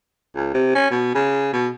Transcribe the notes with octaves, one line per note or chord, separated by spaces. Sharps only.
C#2
C3
C#4
B2
C#3
B2